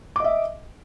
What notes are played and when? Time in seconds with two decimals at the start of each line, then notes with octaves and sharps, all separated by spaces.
0.16 D6
0.20 D#5
0.24 E5